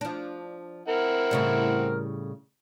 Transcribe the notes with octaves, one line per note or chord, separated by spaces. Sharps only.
F3 D4
C4 E4 A#4 F#5
A2 C#3 G3